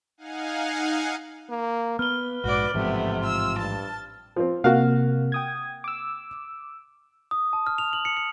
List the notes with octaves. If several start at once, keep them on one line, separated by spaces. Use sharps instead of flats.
D#4 F5 F#5 G#5
A#3
B3 B4 F6 G7
A#1 G#2 F#4 D5
A1 G#2 C3 F3 A3 B3
F4 E6
G2 A5
F3 C4
C3 A#3 F#4 F5
G5 D#6 G#6
D6 E6
D#6
A5
F6
F7
F#7
C#7
C#7